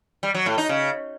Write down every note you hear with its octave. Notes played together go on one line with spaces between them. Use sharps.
G3
F#3
A2
D#4
C#3